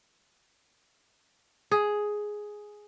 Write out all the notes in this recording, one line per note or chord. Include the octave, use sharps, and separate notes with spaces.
G#4